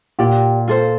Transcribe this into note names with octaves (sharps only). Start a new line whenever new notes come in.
A#2 G4 D5 G5
F4 A4 C5